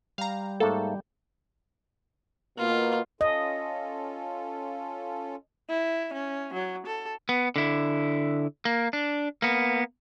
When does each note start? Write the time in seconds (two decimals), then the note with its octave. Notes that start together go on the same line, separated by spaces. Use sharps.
0.18 G3 F5 A#5
0.60 G#2 A3 A#3 A4
2.58 B2 A#3 F4
3.21 C#4 F4 A4 D#5
5.69 E4
6.13 C#4
6.53 F#3
6.86 A4
7.29 B3
7.56 D3 E4
8.65 A#3
8.93 D4
9.42 A#3 B3